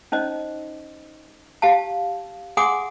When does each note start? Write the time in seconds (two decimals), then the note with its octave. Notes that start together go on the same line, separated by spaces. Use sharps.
0.12 C#4 D#4 C5 D#5
1.62 G4 F5 A5
2.57 G#4 F#5 G#5 C6 D6 D#6